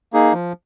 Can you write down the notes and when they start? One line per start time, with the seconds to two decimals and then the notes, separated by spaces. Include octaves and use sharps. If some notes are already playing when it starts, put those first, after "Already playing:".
0.13 A#3 D#4 G#4
0.33 F3